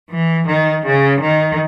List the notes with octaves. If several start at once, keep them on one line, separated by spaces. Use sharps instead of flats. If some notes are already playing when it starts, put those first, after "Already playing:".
E3
D#3
C#3
D#3